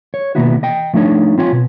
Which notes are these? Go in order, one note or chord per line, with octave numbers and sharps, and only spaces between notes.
C#5
B2 D#3 A#3 B3 E4 F#4
D#5 G5
F3 A3 D4 D#4 C#5
C4 F4 C#5 G5 G#5
B2